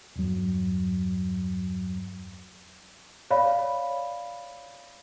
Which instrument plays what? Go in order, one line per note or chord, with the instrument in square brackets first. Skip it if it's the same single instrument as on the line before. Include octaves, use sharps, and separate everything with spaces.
[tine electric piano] E2 G2 F#3
[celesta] C#5 D5 F5 B5